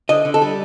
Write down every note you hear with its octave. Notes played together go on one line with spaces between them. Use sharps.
D3 D#5
D3
A4
G3